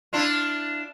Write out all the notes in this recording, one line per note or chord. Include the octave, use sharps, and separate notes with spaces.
D4 E4 F4